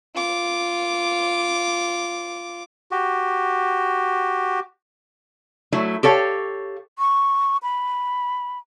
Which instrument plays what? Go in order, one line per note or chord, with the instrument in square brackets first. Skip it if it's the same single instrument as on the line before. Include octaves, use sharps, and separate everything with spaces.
[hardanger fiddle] F4 D6
[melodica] F#4 G4
[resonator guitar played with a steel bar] F#3 A3 E4
G4 A4 C#5 F5
[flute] C#6
B5